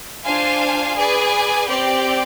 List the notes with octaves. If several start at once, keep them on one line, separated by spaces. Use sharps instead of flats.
D4 F4 C5 F5 G#5
G#4 B4 D5 G#5
C4 G4 D5 G5